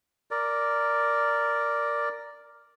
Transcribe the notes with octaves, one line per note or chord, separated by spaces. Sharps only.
A#4 D5